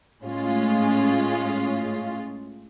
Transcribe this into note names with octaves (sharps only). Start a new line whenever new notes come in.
A2 G#3 C#4 F4